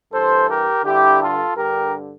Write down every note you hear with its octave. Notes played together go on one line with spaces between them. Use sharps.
G2 E3 A4 C5
G4 A#4
G2 D3 E4 G4
F4 A4
G2 D3 G4 A#4